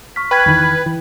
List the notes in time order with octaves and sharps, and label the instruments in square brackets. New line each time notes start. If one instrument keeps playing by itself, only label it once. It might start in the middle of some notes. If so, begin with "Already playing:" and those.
[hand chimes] C#6 F6 B6
[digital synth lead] B4 [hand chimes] G5 F6 G#6
[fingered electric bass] E2 D#3 E3
E3